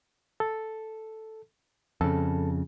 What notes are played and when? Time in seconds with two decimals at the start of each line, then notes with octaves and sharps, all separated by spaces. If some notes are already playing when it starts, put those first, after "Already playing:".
0.40 A4
2.01 F2 C#3 A4 A5